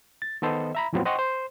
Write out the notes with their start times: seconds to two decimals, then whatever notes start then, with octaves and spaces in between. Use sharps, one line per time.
0.22 A6
0.42 D#3 B3 A4 C5 D#5
0.75 E5 A#5 B5
0.93 E2 A2 F3 F#3 B3 C4
1.05 C5 D#5 F#5 G5 C6 C#6
1.19 C5